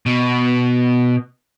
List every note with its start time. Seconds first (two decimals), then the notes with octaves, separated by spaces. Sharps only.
0.06 B2